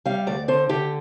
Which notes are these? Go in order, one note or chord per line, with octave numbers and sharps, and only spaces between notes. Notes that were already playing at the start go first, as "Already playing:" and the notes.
G3 F5
D2 D5
D3 C5
D3 G4